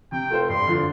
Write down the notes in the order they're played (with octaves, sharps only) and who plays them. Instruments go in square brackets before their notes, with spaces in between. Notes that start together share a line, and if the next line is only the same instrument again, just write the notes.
[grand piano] C3 [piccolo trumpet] G5
[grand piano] A3 F4 C5
[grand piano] G2 [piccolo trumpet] C6
[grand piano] D3 F3